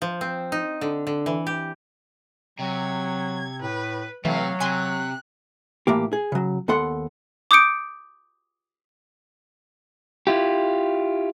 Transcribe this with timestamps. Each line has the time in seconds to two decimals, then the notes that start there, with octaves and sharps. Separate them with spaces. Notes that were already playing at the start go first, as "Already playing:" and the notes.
0.02 F3
0.21 C4
0.52 D#4
0.81 D3
1.07 D3
1.26 E3
1.47 G4
2.59 C3 F#3 G#6
3.62 A2 B4
4.25 C3 E3 F#3 A3 F5
4.60 C3 G#5 C6 F#6
5.87 A2 E3 A#3 G4
6.13 G#4
6.32 C#3 F#3
6.68 D#2 B3 A4 F#5 C6
7.51 D6 D#6 G6 C#7 D7
10.27 E4 F4 G4